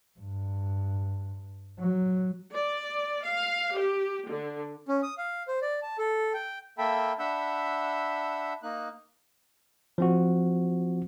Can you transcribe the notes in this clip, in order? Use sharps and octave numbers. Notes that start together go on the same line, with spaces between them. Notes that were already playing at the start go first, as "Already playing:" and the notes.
G2
F#3
D5
F5
G4
D3
C#4
D#6
F5
C5
D5
A5
A4
G5
A#3 A4 E5 G5 B5
D4 E5 F#5 B5 E6 G6
A#3 D#4 F#6
F3 C4 F#4